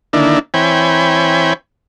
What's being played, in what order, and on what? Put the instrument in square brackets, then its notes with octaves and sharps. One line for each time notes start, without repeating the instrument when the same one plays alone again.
[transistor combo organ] D3 D#3 A#3 D4 E4
E3 C4 C#5 G5 G#5 B5